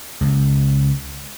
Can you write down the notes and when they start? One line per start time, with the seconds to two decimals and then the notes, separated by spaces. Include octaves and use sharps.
0.21 C#2